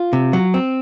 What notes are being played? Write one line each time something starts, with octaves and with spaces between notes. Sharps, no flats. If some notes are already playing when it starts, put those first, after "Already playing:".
Already playing: F4
C3
F#3
C4